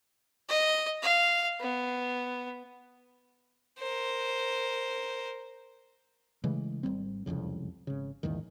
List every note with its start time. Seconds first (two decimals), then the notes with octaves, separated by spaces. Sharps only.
0.49 D#5
1.02 F5
1.60 B3
3.79 A#4 C5
6.44 C#3 E3 G#3 A3
6.83 G#1 F2 G3 C4
7.26 E1 C2 F2 C#3
7.87 G#1 C#3
8.23 A#1 E2 G#2 D#3